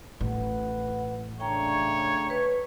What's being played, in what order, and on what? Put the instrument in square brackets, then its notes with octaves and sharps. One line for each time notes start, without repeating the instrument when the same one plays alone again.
[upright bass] A1 [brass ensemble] B4 F#5
[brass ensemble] C#3 A3 D4 [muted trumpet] C#5 [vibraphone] G5 A#5
[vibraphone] B4